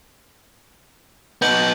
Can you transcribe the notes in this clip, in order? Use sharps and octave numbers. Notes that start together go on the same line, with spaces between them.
B3 D#4 G6 F#7